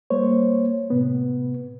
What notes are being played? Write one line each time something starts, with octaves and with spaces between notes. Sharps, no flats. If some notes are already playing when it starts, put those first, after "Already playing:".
G3 A#3 C5 C#5
A2 C3 B3